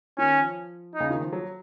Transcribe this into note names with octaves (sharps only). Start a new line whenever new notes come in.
D#3 C#4
F3
D#4
C#3
D#3
F3
F#3